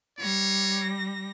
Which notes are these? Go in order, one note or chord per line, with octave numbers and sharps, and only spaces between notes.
G3 C#5 A#6